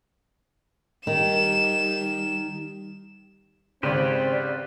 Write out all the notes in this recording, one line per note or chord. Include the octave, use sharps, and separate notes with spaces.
D#3 G3 E7
G#1 C#3 C4 G4 B4 C5 D5